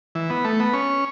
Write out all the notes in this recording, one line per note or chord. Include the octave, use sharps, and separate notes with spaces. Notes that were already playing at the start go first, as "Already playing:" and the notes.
E3
B3
A3
B3
C#4